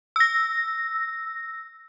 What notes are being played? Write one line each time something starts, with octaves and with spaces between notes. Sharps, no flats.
E6 A#6